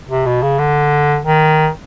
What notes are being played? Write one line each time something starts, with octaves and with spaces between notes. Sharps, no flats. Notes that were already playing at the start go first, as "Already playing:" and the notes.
C3
B2
C#3
D3
D#3